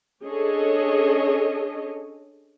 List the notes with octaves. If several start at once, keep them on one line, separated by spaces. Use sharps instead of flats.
C#4 D4 G#4 A4 C#5 D#5